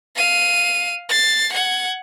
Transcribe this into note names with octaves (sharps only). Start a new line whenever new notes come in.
F5 D#7
A6 C7
F#5 G#6